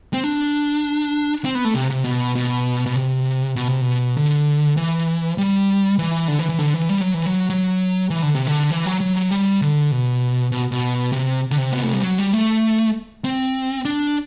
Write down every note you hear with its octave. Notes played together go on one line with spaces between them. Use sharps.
C4
D4
C4
B3
A3
C3
C3
B2
B2
B2
C3
B2
C3
B2
D3
E3
G3
E3
D3
E3
E3
D3
E3
G3
F#3
E3
F#3
F#3
E3
D3
C3
D3
E3
F#3
F#3
F#3
G3
D3
B2
B2
B2
C3
D3
C3
B3
A3
G3
F#3
G3
A3
C4
D4